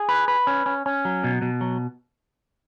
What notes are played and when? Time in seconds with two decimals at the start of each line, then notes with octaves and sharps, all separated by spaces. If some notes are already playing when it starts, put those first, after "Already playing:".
Already playing: G#4
0.09 B4
0.28 B4
0.47 C#4
0.66 C#4
0.86 C#4
1.05 F#3
1.24 B2
1.42 B2
1.61 F#3